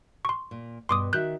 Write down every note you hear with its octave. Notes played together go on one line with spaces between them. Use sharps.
C6 C#6
A#2
G2 B2 B3 C6 D6 D#6
D#3 F#4 E5 F#6 G6